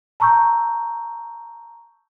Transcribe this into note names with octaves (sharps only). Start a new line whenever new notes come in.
A5 A#5 C#6 E6 G6